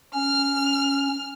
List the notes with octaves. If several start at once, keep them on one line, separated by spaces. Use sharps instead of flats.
C#4 F6